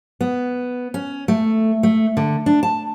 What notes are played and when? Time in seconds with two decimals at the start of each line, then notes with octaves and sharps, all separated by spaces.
0.21 B3
0.94 C#4
1.28 A3
1.83 A3
2.17 D3
2.46 D4
2.63 A5